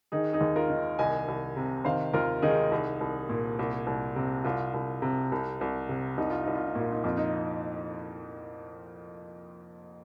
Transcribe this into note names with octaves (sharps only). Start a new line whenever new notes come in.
D#3 D#4 G#4
D#4 G#4
D#2
F4 A#4
D#3
C2 D#5 G#5
C2
C3
D#3 C5 F5
D#2 F4 A#4
D#3 D#4 G#4
C2
C2
A#2
C2
C2
C3
C2 F4
C2
C3
C2
C2
C3
C2 D#4
F4
C2 D#4
F4
D#4
A#2 F4
D#4
F2 F4
D#4